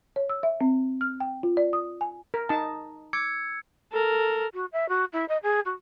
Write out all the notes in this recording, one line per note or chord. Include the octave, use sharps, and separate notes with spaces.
C#5
E6
E5
C4
F6
G5
F4
D5
D#6
G#5
A#4
D#4 A5
D6 E6 G#6 C#7
A4 A#4
F#4
E5
F#4
E4
D#5
G#4
F#4